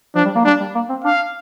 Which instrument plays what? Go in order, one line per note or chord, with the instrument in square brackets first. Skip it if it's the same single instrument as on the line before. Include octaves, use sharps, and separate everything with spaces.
[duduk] F3 [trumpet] D4
[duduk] G3
A#3
[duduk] G3 [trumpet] D4
[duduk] G3
A#3
C4
[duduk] D4 [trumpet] F5